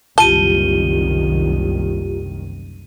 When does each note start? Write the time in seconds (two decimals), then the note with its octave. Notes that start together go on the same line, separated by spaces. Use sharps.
0.18 F#1 C2 D#3 F4 G4 A5 D#7 G7